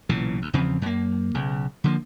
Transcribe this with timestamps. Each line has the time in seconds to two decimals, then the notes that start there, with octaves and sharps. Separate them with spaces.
0.09 B1 A#2 C#3 E3
0.42 D2
0.53 E2 C#3 F3 C4
0.82 F#2 A#3
1.35 B1 C#3
1.84 D3 F3 A#3